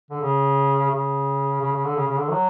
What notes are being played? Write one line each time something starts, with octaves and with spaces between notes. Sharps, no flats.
D3
C#3
C#3
C#3
C#3
D3
C#3
C#3
D3
F#3